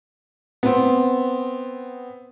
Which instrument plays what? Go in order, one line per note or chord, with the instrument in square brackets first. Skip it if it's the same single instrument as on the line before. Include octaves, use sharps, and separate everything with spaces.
[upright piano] B3 C4